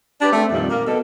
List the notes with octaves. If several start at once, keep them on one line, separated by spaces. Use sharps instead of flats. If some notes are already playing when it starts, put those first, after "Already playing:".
D4 G4 B4 D5
A3 C4
F2 A#2 D#3 G3
A#3
B2 A4